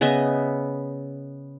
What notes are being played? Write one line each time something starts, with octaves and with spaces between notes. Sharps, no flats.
C#3 B3 D#5 E5